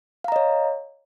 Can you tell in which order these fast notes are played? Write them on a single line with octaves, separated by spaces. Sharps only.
F5 A#5 D#5 C#5